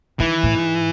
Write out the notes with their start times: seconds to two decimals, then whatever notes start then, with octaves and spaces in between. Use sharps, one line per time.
0.20 D#3 E3
0.43 A2
0.54 G#2